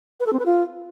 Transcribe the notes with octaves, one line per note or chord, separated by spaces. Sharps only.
B4
A4
C4
B4
F4